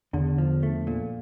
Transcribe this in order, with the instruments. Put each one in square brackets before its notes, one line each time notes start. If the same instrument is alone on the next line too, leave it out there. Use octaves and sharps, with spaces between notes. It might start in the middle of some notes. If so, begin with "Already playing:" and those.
[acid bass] E2 [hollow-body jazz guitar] D3
[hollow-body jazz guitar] F3
A3
A#2